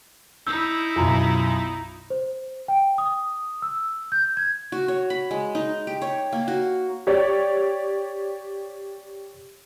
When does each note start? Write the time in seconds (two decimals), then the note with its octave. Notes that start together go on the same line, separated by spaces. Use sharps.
0.47 D#4 E4 E6 G6
0.96 B1 F#2 F4 A#5
2.10 C5
2.68 G5
2.98 D#6
3.62 E6
4.12 G6
4.37 G#6
4.72 F#4
4.88 C#5
5.10 B5
5.31 G#3
5.55 D#4
5.87 G4
6.02 C#5
6.32 A#3
6.48 F#4
7.07 G4 C#5 D5